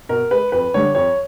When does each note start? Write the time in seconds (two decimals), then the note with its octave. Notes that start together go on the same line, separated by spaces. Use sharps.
0.09 B2 A#4
0.31 G#3 B4
0.52 F2 B4
0.74 D3 G3 C#5
0.95 F2 C#5